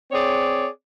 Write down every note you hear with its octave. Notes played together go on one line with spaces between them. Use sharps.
C4 G#4 C#5 D5